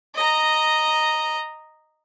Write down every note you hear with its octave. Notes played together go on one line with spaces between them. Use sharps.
D#5 A#5